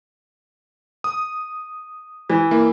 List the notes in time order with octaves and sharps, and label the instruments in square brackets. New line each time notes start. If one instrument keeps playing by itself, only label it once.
[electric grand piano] D#6
[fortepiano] E3
[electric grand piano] A#3 E4